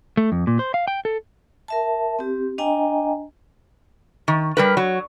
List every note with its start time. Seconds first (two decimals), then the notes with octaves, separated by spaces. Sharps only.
0.17 A3
0.32 F2
0.47 A#2
0.59 C5
0.74 F5
0.88 G5
1.05 A4
1.68 A#4 E5 A5
2.19 C4 G4
2.58 D4 D#5 G5 G#5 A#5
4.28 D#3
4.57 G3 A#4 B4
4.77 F#3